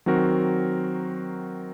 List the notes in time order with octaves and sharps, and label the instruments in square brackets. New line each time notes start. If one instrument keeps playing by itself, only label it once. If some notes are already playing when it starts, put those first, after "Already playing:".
[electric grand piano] D#3 F#3 C4 F#4 A#4